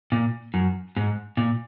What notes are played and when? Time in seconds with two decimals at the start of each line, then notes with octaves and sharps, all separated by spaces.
0.12 A#2
0.54 F#2
0.97 G#2
1.37 A#2